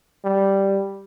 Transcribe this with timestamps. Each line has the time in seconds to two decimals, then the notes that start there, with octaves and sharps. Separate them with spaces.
0.25 G3